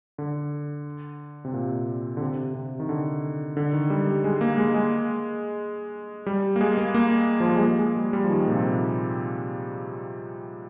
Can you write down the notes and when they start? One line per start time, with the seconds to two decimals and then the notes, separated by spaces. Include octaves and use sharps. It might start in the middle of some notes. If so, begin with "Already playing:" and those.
0.18 D3
1.45 C3
1.53 A#2
2.17 D3
2.21 C3
2.55 C3
2.80 D#3
2.89 D3
3.57 D3
3.73 D#3
3.90 G3
4.07 G3
4.24 G#3
4.41 A#3
4.58 G#3
4.74 G#3
6.26 G3
6.56 A#3
6.61 G#3
6.78 A#3
6.94 A#3
7.40 F3
7.48 G3
7.56 G#3
7.63 A#3
7.79 G#3
7.97 G3
8.13 G3
8.24 F3
8.30 D#3
8.47 A#2
8.52 C3